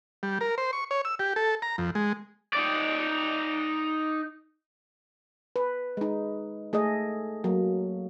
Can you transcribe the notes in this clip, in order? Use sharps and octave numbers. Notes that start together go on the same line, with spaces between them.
G3
A#4
C5
C#6
C#5
E6
G4
A4
A#5
F2
G#3
D#4 D5
B4
G#3 D#4
A3 G#4 A4 D#5
F#3 A#3